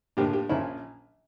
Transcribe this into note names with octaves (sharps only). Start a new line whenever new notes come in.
A2 F3 A#3 D4 G4
G4
A#1 A#2 F3 C#4 E4